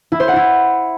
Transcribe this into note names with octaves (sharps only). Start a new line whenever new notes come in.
E4
C5
F#5
E4